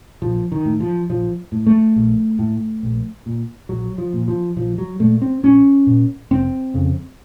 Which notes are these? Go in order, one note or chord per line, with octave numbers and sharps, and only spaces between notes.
A#1 F3
D#3
A2
F3
A#1 F3
A2
A3
A#1
A2
A#1
A#2
A#1 F#3
F3
A#2
F3
A#1 F3
F#3
A#2 A3
C4
A#1 C#4
A#2
F1 C4
F2 C#3